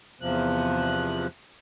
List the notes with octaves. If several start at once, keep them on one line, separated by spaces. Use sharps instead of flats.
E2 C3 F3 F#6